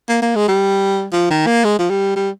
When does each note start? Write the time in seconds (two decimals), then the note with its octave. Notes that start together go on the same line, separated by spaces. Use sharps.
0.08 A#3
0.22 A#3
0.35 G#3
0.48 G3
1.12 F3
1.30 D#3
1.46 A#3
1.64 G#3
1.79 F3
1.90 G3
2.16 G3